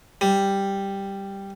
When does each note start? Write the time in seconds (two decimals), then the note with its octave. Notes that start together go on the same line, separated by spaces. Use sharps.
0.21 G3